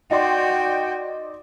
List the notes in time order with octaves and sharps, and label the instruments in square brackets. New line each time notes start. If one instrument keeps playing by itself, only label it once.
[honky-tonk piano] D#4 D5 C6 [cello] F#4 [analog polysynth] G5